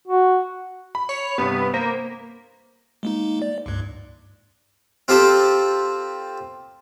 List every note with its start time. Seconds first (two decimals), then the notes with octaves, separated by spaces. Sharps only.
0.07 F#4
0.95 B5
1.09 C#5
1.38 G2 C3 B3
1.74 A#3 C5
3.03 G#3 A#3 D#4
3.42 D5
3.66 C#2 G2
5.08 C4 F4 G4 A4 C5